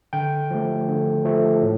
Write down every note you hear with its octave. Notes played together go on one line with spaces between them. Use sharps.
D3 G5
F3 A3
D3
F3 A3
A2